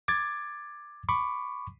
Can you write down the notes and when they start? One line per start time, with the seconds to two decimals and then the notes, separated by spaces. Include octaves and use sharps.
0.08 D6 G#6 A6
1.09 B5 C#6 D6